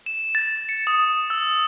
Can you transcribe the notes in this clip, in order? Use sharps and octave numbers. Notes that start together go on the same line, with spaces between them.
E7
A6
C#7
D#6
E6